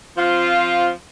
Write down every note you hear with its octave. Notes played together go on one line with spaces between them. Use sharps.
F3 C4 F4